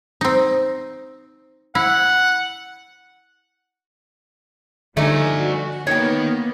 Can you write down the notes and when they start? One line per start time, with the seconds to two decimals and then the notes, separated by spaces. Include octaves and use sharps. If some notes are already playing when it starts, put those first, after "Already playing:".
0.21 C4 D#4
1.75 E4 F#5
4.97 D3 F3 G3 A3 D#4 D5 G#5
5.39 F#4
5.87 D#3 A#3 B3 C#5 G5